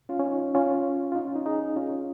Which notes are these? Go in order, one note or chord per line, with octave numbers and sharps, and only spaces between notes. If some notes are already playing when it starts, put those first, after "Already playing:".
C#4 F4
C#4
D#4
C#4 F4
F4
D#4
C#4
D#4
D#4 G#4
C#4 F4